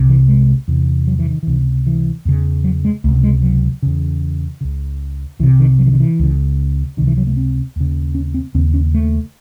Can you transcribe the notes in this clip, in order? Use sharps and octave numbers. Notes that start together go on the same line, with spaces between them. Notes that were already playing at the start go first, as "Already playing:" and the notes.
Already playing: C2 C3
E3
G#3
E2 C3
F#3
E3
D#3
C#2 C3 E3
E3
E2 C#3
F#3
G#3
C#2 C3 A3
G#3
F#3
E2 C#3
C#2 C#3
C2 C3 E3
D#3
F#3
E3
D#3
E3
C#2 C#3
C#2 C3 D#3
E3
F#3
A3
C4
D#2 C#3
C#4
C4
D#2 C#3 C4
C#4
A3